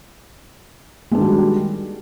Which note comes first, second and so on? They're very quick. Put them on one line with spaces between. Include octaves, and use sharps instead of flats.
G#3 D4 D#3 F#4 G3